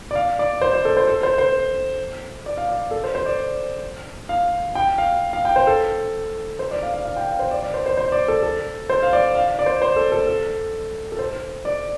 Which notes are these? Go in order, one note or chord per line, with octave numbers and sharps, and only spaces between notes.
D5
F5
D5
C5
C5
A4
C5
A4
C5
C5
D5
F5
D5
A4
C5
C5
D5
F5
G5
F5
F5
G5
C5
A4
C5
D5
F5
F5
F5
G5
F5
C5
D5
D5
C5
C5
C5
D5
A4
A4
C5
F5
D5
F5
D5
C5
C5
A4
A4
A4
A4
C5
D5